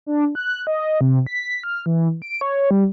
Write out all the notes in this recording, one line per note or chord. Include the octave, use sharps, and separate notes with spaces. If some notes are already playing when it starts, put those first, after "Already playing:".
D4
F#6
D#5
C3
B6
F6
E3
D7
C#5
G3